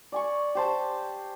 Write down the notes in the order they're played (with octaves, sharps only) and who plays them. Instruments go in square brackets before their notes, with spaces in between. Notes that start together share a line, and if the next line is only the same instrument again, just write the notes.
[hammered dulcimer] D5 G#5 C#6
G4 C5 A5